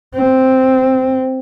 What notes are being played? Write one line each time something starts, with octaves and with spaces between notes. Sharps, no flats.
C4